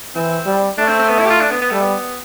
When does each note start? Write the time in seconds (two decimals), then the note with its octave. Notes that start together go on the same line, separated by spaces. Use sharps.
0.15 E3 C4
0.46 G3
0.78 A3 D4
0.88 C4
0.99 C4
1.09 B3
1.19 E4
1.25 G4
1.30 F4
1.40 D4
1.51 B3
1.62 B3
1.71 G3 A3
1.82 B3